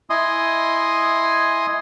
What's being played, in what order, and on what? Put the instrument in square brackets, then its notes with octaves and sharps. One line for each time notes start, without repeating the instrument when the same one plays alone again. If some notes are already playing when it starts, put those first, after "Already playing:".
[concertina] E4 D#5 G#5 C6 D#6